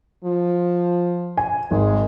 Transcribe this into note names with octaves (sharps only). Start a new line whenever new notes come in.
F3
G#5
G#1 G#3